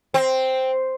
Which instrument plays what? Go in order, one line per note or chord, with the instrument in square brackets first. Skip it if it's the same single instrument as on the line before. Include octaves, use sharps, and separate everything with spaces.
[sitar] C4